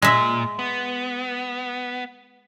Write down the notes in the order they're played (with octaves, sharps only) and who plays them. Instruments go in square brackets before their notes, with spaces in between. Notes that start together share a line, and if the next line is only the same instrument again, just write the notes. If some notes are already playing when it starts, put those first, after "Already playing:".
[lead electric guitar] A#2 [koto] G#3 E5
[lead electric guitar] B3